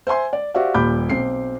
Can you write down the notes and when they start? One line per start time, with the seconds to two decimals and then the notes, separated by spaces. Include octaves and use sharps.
0.07 C5 E5 G#5 C6
0.33 D5
0.54 F#4 G4 C5 D5 E5 F5
0.74 D#1 A#2 G3 B5 D6 G6
1.10 B1 C4 C7